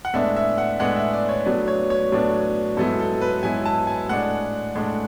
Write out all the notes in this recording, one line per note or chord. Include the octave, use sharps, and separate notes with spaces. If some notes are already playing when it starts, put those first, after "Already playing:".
F#5
A2 G#3 B3 D4 E5
E5
F#5
A2 G#3 B3 D4 F#5
E5
D5
C#5
A2 F#3 B3 D4
C#5
C#5
A2 F#3 B3 D4
G#2 F#3 B3 E4 A4
A4
B4
G#2 F#3 B3 E4 G#5
A5
G#5
A2 G#3 D4 F#5
A2 G#3 D4